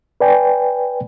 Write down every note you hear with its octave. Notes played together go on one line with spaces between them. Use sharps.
B4 D5 G5 G#5